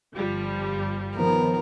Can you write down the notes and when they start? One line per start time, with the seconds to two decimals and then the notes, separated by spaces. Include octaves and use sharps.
0.15 G1 F3 G3 F4
1.15 D#3 F3 B3 A#4